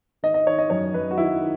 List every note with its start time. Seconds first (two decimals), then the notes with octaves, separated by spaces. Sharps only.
0.23 D#3 D#5
0.34 D#5
0.47 D#3 C#5
0.58 D#5
0.70 F#2 C#5
0.94 F#2 B4
1.11 F#4
1.17 D#3 E4
1.40 D#3